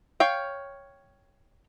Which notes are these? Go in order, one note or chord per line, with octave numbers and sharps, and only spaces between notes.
C#5 F5 G5